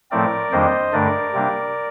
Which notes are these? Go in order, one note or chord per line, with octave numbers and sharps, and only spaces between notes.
A2 F3 A3 C4 A#4 D5
F2 D#3 G3 A#3 D4 C5 D#5
G2 D3 A3 D4 A#4 D5
C3 G3 A#3 D4